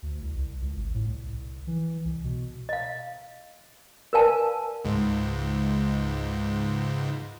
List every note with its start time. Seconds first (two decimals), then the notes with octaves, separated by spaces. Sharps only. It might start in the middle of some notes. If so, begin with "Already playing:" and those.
0.02 D2
0.21 C2
0.36 C2
0.61 C#2
0.75 G#1
0.94 A2
1.06 C2
1.67 E3
2.05 C2
2.24 B2
2.69 D#5 F5
4.13 A#4 B4 D5 F5 G#5 A5
4.84 C#2 G#2